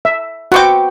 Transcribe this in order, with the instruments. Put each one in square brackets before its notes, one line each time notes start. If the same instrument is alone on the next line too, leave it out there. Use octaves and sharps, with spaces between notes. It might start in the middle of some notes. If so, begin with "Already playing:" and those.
[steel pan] E5
[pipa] B3 C4 G5 [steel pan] F#4 C#6 D6